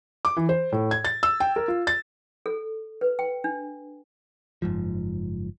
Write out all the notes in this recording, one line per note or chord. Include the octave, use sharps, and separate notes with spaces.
D6
E3
C5
A2
G#6
A6
E6
G5
A#4
F4
A6
A4
B4
G5
D4
F#1 G#2 F3